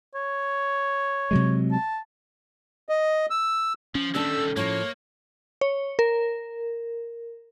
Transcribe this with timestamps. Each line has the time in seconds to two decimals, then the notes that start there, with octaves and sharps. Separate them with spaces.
0.15 C#5
1.31 C3 F#3 G#3
1.72 A5
2.89 D#5
3.30 E6
3.95 F3 C#4
4.14 D#3 G3 A3 D4 A4 E6
4.57 A2 F3 A#3 C#5
5.61 C#5
5.99 A#4